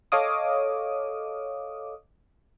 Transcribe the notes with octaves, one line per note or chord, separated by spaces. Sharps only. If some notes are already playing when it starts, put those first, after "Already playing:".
A4 C#5 D#5 F5 D6 D#6